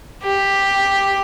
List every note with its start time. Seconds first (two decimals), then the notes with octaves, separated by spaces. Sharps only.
0.24 G4